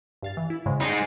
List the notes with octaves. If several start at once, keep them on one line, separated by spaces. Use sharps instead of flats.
G2 F5 A6
E3
E4
G#2 C#3 G#3
G3 G#3 D#4